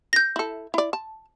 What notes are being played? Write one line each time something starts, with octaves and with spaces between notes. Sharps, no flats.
G6 A#6
E4 A4
E4 D5
A5